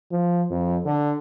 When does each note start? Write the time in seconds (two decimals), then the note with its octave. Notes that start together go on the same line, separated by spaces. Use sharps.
0.12 F3
0.51 F2
0.85 D3